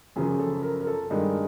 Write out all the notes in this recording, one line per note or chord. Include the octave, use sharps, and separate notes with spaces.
F#2 C#3 F3 G#4
A4
A#4
A#4
A4
G2 D#3 G#3 D#4